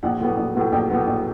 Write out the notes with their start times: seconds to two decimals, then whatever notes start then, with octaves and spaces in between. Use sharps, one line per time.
0.03 A#1 F#5
0.20 A2 F#3 B3
0.37 A#1
0.55 A2 F#3 B3
0.72 A#1 G5
0.90 A2 F#3 B3
1.07 A#1